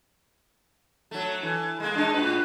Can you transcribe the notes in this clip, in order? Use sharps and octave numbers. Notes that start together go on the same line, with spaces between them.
F#3 A3
E3
G#3 A#3
G#3 D4 D#4
A2 F#4 B4